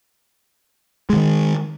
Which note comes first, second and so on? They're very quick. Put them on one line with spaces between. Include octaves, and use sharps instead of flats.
G#3 D3 D#3